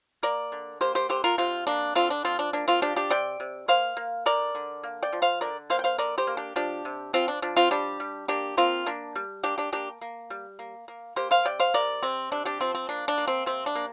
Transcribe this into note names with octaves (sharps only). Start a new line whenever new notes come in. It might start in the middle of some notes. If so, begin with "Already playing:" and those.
A#3 A#4 D5
D3
A#3 G4 C5
G4 C5
D3 G4 C5
F4 A#4
C3 C4 F4
A#3 D4
D3 C4 F4
D4
F3 C4 F4
D4
A#3 D4
C4 F4
F3 D4 G4
D4 G4
C3 D5 G5
C3
A#3 C5 F5
A#3
D3 A#4 D5
D3
A#3
D5 G5
F3
C5 F5
D3 A#4 D5
A#3 C5 F5
G5
C5 F5
D3 A#4 D5
G4 C5
A#3
D4 G4
F3 D4 G4
C3
F3 C4 F4
D4
F3 D4
C4 F4
G3 D4 G4
G3
A#3 D4 G4
A#3 C4 F4
A#3 D4
G3
A#3 D4 G4
D4 G4
A#3 D4 G4
A#3
G3
A#3
A#3
A#3 G4 C5
C5 F5
C3 D5 G5
C5 F5
C3 A#4 D5
C3 C4
C3 D4
D4 G4
F3 C4
C4
A#3 D4
D4
A#3
C4
C3 C4
D4
A#3